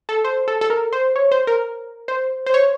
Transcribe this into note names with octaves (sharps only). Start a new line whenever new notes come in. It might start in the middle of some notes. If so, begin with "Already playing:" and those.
A4
C5
A4
A4
A#4
C5
C#5
C5
A#4
C5
C5
C#5